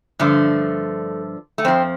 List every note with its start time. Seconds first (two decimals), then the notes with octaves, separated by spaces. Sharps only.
0.19 G2 D3 F3 A3
1.58 A3
1.65 F2 F3 C4